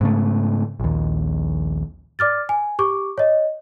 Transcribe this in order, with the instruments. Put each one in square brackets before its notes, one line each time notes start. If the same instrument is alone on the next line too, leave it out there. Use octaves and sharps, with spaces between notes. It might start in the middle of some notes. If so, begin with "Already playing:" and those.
[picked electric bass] G#2 C#3 A3
A#1 D#2
[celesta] D5 D6 F6 A6
G#5
G4 C#6 D6
C#5 D#5